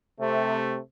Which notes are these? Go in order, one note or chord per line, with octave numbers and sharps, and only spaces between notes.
C3 A3